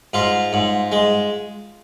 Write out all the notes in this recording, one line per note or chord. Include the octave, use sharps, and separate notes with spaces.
G#2 F4
G#2
G#3